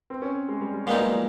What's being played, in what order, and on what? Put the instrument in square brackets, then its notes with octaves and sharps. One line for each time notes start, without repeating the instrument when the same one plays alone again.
[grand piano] C4
C#4
G#3
G3
G3
[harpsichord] A#2 G3 B3 D#4 [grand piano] G#3
[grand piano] F#3
F3